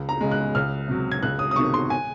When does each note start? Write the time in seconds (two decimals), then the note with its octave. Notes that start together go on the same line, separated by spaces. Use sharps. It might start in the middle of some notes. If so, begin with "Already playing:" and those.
Already playing: C#2
0.09 A#5
0.21 C#3 G#3
0.31 F#6
0.55 C#2 F6
0.88 C3 F#3
1.12 G#6
1.23 C#2 F#6
1.39 D#6
1.51 D#6
1.56 C3 D#3 C#6
1.74 C6
1.90 G#5